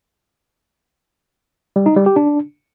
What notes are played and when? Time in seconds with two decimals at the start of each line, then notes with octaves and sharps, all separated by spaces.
1.76 G3
1.86 D#4
1.96 G3
2.06 G4
2.16 D4